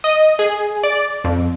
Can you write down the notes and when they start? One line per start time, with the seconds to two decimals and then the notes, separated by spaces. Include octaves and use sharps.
0.04 D#5
0.39 G#4
0.83 D5
1.24 F2